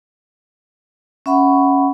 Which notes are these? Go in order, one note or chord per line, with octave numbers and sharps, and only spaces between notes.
C#4 E5 F#5 B5 C#6